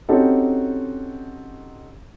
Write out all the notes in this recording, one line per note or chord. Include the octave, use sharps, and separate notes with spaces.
C4 C#4 D#4 F#4 G4 A4